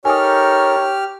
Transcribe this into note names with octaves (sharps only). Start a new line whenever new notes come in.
D#4 G4 A4 A#4 C#5 G#5 D#6 F6